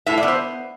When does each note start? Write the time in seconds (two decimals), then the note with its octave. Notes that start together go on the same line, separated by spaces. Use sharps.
0.06 A2 E5
0.17 D5
0.23 B3
0.28 C5